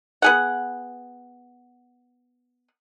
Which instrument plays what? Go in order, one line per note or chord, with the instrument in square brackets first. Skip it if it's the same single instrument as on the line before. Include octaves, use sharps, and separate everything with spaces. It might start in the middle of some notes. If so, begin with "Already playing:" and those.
[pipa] B3 G#4 F#5